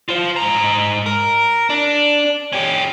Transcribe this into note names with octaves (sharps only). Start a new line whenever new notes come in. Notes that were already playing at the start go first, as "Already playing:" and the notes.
F4 C5
G#2 A#5
A#4
D4
C#4 G4